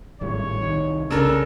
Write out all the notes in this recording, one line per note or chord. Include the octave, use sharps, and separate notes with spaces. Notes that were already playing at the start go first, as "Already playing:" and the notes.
G#1 A2 G3 C#5
C2 D#3
C2 C#3 D4 A4 A#4